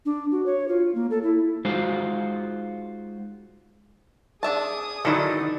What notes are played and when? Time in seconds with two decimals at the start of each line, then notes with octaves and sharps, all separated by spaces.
0.05 D4
0.31 F#4
0.46 C#5
0.68 F4
0.95 A#3
1.11 A4
1.23 E4
1.65 G#3 D#4 F4 F#4 C5
4.43 D4 G#4 E5 A5 D#6
5.05 D3 D#3 F#3 D#4 E4 A4 D5